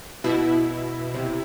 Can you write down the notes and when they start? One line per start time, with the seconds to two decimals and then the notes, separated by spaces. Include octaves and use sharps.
0.24 B2 E4
1.14 C3